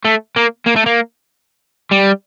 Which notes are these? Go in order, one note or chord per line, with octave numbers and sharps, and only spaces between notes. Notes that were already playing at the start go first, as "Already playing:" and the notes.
A3
A#3
A#3
A3
A#3
G3